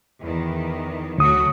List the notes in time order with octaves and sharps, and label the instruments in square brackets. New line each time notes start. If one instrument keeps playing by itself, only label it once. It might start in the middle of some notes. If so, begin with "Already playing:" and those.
[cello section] E2 D#3
[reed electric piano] D2 D#6 [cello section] F#3 A3 F#4